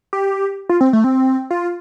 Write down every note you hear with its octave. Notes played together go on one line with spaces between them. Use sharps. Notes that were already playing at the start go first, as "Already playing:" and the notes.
G4
F4
C4
A3
C4
F4